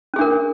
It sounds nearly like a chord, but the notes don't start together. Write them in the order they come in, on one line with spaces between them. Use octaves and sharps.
C#4 G#4 D4 A#4